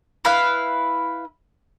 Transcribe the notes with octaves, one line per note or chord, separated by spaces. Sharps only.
E4 B4 F5